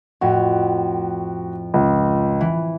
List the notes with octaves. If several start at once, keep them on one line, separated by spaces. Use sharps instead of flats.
F2 A2 F#4
C#2
E3